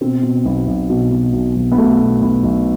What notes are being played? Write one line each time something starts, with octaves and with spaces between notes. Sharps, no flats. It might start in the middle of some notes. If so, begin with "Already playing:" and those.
B2 C4
B2
B1 B3
B1
B2
B2
B1
B1
B3
B2 A3
B2
B1 B3
B1